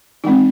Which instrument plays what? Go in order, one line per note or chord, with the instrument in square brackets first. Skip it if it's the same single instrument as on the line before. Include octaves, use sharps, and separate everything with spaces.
[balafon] E3 G#3 C4 D#4